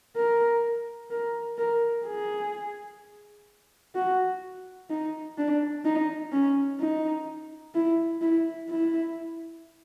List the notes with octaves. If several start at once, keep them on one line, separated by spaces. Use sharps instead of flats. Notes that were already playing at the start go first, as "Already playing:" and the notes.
A#4
A#4
A#4
G#4
F#4
D#4
D4
D#4
C#4
D#4
E4
E4
E4